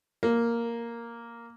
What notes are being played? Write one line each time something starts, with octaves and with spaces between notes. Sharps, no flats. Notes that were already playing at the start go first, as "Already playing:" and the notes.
A#3